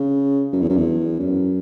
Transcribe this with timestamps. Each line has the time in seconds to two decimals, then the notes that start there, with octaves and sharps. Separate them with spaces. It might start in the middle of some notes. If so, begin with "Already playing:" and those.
Already playing: C#3
0.53 F#2
0.61 E2
0.70 F#2
0.77 E2
1.20 F#2